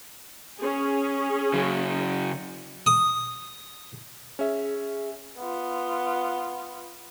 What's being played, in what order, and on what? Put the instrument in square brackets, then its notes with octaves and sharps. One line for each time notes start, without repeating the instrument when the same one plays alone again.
[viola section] C#4 G#4
[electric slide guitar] C#3 F#3
[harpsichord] D#6
[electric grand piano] C#4 E5 [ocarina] G#4
[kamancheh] B3 F4